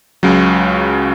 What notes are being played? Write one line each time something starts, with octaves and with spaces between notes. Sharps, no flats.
C#2 C#3 F#3